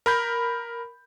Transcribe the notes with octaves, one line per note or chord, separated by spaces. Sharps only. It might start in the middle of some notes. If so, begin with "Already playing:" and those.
A#4 B5 G6